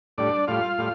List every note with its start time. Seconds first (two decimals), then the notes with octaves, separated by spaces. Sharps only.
0.18 A2 G3 D4 D5
0.47 A2 G3 F4 F5
0.78 A2 G3